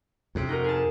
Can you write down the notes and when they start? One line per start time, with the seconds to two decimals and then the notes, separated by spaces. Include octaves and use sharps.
0.35 F2 C3
0.49 D#4 F#4 A#4
0.64 G#4 A5